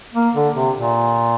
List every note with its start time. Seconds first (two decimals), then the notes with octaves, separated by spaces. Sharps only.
0.14 A#3
0.35 D3
0.56 C3
0.77 A#2